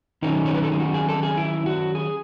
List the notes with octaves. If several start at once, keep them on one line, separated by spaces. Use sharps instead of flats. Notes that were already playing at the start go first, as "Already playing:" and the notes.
D#3 F#3 C#4 D#4
C#5
B4
A4
G#4
F#4
G#4
A4
G#4
E4
F#4
G#4